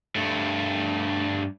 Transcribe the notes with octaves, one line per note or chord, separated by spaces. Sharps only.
G2 A3